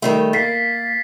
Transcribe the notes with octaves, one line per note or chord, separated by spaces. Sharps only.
D#3 G3 A3
A#3 A6 B6 C7